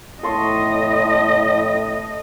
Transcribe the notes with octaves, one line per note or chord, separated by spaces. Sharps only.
A2 A4 D#5 C6 C#6